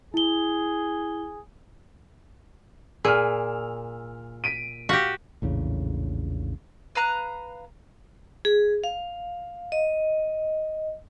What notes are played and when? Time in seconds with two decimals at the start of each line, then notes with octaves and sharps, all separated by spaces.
0.14 E4 G#4 G7
3.05 A#2 G#4 E6 F6
4.44 B6 D7 D#7
4.89 F#4 G4 F5 F6 B6
5.42 A#1 E2 A2 C#3
6.95 B4 F5 A#5 F#6
8.45 G#4
8.84 F5
9.72 D#5